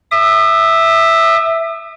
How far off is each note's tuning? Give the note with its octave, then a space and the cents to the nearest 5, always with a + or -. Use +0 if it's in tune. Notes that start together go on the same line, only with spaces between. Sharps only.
E5 +0 D#6 -40